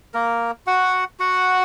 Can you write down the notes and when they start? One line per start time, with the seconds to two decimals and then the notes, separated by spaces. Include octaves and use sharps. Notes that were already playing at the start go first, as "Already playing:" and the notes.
0.14 A#3 A#4
0.67 F#4 F#5
1.20 F#4 F#5